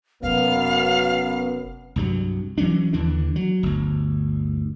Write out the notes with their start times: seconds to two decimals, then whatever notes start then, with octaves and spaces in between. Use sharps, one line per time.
0.23 F#1 F#2 C3 B3 F5
1.96 C2 G2 F#3
2.58 E3 F#3 C#4 D4
2.93 D#2 D3 E3 D4
3.36 F#3
3.63 G1 D2